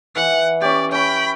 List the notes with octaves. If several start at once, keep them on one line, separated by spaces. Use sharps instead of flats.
E3 F#5
C#4 G4 D5
C#4 G5 B5